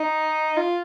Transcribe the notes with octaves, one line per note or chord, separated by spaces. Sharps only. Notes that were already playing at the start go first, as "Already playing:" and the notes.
Already playing: D#4
F4